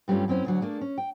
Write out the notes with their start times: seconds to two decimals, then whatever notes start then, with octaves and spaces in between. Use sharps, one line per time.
0.08 G2 G3 A3 C#4 F4
0.28 F#2 C4 C#4 E4
0.45 D2 D3 F#3
0.61 A3 A#3 D4 G#4
0.81 C#4
0.98 G5